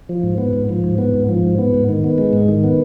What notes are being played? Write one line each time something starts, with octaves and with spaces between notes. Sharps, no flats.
F3
G#2
B3
G#2
F3
G#2
B3
G#2
F3
G#2
B3
G#2
D#3
B3
G#3
G#2
D#3
B3